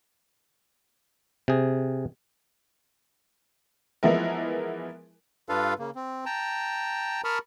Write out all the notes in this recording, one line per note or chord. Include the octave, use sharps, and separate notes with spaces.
C3 G#4
E3 F3 G#3 B3 E4 A#4
G2 D4 F4 A4 B4 F5
C#3 A#3
C4
G5 A5 A#5
A#4 A5 B5 C#6 D#6 F6